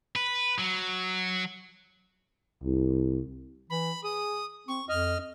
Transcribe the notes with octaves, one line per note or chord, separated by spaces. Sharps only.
B4
F#3
C2
E3 B5
G#4 D#6
C4 C#6
F2 D#5 F6